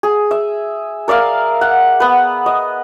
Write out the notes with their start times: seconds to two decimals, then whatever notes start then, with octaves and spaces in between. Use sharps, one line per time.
0.03 G#4
0.31 E5
1.08 A#4 D5 E5 F5
1.61 F#5
2.00 B3 B4
2.46 D#5